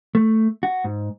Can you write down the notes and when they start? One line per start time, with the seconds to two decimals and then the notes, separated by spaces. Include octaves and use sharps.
0.15 A3
0.63 F#4
0.84 G#2